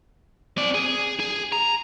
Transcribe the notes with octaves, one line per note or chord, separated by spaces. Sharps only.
C4 D5
G#4
G#4
A#5